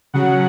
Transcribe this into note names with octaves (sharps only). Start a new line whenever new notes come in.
C#3 F#3 F#5